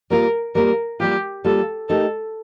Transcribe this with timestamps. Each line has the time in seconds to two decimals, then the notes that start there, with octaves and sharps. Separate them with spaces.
0.10 G3 A#3 F4 A#4
0.55 G3 A#3 F4 A#4
1.00 G3 A#3 F4 G4
1.44 G3 A#3 F4 A4
1.89 A3 D#4 G4 A4 A#4